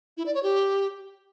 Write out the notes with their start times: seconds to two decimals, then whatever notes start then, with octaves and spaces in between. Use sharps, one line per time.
0.17 E4
0.26 D5
0.35 C#5
0.43 G4